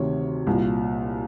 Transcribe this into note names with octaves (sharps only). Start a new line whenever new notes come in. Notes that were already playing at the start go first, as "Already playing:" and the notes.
Already playing: D2 C3 D#3 C#5
C2 A#2